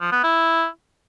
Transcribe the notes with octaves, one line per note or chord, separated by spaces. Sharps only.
F3
B3
E4